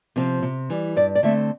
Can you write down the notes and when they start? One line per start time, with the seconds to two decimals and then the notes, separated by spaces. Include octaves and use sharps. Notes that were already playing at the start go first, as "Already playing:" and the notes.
0.16 C3 F3 C4
0.43 C3
0.70 E3 G3
0.96 G2 D5
1.15 D5
1.23 D3 A3 C4 E5